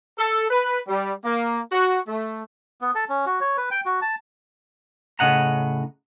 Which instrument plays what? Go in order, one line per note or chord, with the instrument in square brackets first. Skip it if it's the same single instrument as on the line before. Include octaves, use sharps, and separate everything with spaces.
[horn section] A4
B4
G3
A#3
F#4
A3
[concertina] B3
A4
C#4
F#4
C#5
B4
G5
F#4
A5
[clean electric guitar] A2 C#3 D#5 F#5 A#5